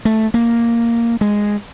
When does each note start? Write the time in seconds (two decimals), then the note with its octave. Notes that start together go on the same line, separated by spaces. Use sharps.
0.05 A3
0.34 A#3
1.21 G#3